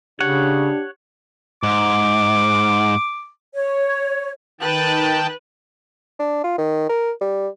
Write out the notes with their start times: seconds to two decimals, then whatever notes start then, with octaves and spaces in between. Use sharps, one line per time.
0.20 C#3 D4 G4 C#5 F#5
1.63 G#2 D6
3.55 C#5
4.61 D#3 B4 G5 A5 F#6
6.19 D4
6.44 F4
6.58 D#3
6.89 A#4
7.21 G3